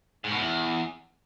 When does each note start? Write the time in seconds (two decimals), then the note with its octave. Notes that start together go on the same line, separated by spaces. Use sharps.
0.24 G#2
0.31 B2
0.38 E2